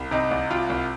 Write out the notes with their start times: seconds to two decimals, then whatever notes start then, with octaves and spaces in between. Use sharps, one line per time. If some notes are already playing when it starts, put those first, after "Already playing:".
Already playing: C2
0.11 C3 D#4
0.31 C2
0.50 C3 F4
0.70 C2